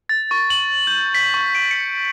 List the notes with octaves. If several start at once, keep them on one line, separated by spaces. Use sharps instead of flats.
A6
C#6
F#7
G6
B6
C#6
D7
C#7